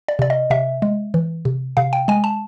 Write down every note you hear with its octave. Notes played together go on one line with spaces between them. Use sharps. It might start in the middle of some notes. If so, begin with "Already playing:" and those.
D5
C3 D5
D#5
C3 E5
G#3
E3
C3
C3 F5
G5
G#3 G#5
A5